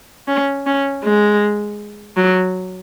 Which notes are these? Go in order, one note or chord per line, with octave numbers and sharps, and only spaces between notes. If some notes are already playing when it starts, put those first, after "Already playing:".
C#4
C#4
G#3
F#3